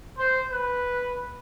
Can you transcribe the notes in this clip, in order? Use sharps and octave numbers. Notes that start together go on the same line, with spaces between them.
C5
B4